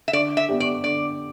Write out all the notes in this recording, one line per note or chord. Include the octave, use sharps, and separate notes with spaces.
E5
D3 D5
E5
B3 D4 G4
D5
D3 D5